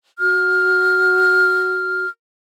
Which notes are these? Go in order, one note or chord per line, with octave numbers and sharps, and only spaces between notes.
F#4 F6